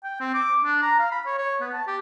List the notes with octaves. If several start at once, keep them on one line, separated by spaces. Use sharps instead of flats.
G5
C4
D6
D4
A#5
F5
B5
C#5
C#5
B3
A5
G4